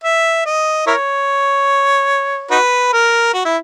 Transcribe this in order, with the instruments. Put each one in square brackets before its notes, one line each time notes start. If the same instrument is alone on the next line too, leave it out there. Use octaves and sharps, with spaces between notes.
[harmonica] E5
D#5
E4 A#4 C#5
D#4 F#4 B4
A#4
F#4
E4